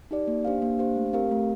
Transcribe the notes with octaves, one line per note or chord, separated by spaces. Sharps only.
D#4 G4 D5
A#3
D4 G4 C5 F5
A#3
D4 G4 C5 F5
A3
C4 G4 A#4 F5
A3